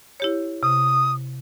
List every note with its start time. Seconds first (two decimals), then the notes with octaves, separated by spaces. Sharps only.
0.20 E4 G4 C#5
0.63 C3 D#6